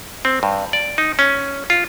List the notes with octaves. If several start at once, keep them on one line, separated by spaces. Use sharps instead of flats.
C4
G2
D5
D#4
C#4
F4